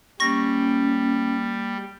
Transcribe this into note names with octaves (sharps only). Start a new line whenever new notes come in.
G3 A#3 C#4 C#6 A#6